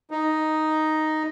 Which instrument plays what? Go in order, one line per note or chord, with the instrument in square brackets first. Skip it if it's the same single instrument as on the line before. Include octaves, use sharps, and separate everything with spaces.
[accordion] D#4